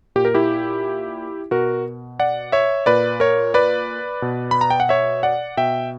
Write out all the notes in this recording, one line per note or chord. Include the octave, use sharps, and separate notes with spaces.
A#2 G4
A#4
E4 G4
B2 F#4 A#4
D5 F#5
C#5 E5
A#2 B4 D5
A#4 C#5
B4 D5
B2
B5
A#5
G5
F#5
C#5 E5
D5 F#5
B2 E5 G5